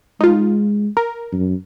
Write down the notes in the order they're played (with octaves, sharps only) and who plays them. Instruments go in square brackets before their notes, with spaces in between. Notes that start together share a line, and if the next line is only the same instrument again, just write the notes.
[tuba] G#3 [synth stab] D#4 F4
[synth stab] A#4
[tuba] F#2